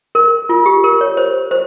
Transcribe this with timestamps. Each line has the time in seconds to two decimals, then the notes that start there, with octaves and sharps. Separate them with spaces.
0.15 A#4
0.49 F4
0.66 G4
0.84 A#4
1.01 C#5
1.17 C5
1.51 C5